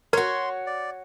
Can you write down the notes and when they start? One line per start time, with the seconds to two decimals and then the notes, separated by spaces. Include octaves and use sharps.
0.13 F#4 A#4 C#5 C6
0.67 D5